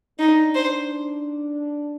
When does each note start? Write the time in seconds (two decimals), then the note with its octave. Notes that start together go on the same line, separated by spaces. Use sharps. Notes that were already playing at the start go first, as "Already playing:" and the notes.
0.19 D4 D#4
0.55 C5